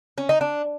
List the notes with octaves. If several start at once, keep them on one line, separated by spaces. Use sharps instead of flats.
C#4
D#4
D4